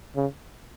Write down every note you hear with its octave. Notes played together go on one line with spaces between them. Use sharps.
C#3